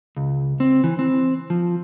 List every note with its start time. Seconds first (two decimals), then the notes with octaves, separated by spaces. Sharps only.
0.17 C#2
0.60 C4
0.84 E3
0.99 C4
1.50 F3